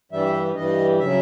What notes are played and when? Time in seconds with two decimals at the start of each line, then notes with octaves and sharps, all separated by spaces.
0.12 G2 E3 G3 E5
0.55 G2 E3 G3 D#5
0.99 C#3 F#3 E5